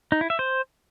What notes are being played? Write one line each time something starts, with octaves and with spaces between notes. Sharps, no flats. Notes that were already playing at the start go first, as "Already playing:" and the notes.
D#4
E4
E5
C5